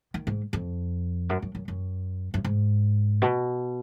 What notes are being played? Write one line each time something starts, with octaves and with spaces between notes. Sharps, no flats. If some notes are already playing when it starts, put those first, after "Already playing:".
D#3
G#2
F2
F#2
F#2
F#2
F#2
F#2
G#2
B2